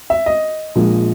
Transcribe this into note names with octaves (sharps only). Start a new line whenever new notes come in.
E5
D#5
A#1 A#2 F3 G#3